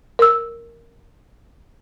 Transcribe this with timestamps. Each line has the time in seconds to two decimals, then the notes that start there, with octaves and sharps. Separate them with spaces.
0.19 A#4 E6